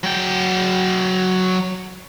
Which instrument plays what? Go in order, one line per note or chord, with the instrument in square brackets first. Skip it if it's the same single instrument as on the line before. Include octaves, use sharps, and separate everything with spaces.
[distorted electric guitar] F#3 G5